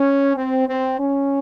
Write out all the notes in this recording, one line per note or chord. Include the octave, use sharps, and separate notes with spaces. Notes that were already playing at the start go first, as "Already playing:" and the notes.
Already playing: C#4
C4
C4
C#4